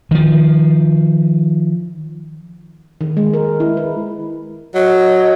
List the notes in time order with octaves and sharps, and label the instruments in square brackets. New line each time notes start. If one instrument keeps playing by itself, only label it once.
[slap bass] D#3 F3
[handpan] D#3
G#3
A#4
E4
B4
[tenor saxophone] F#3 [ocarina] D#5